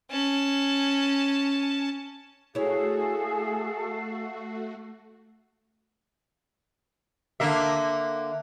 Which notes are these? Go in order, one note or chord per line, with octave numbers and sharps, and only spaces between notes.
C#4 A5
A3 E4 F#4 G#4 A4 C#5 F5
D3 A#3 E5